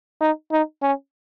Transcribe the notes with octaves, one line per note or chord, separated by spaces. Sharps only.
D#4
D#4
C#4